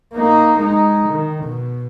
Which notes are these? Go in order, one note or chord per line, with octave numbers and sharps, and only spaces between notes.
A#3 D#4
G#3 D#4
D#3
B2